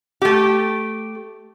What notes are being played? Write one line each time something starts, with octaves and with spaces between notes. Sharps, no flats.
A3 G4